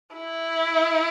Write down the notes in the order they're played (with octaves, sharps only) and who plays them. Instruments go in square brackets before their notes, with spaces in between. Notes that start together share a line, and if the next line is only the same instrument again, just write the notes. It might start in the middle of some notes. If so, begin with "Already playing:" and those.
[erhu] E4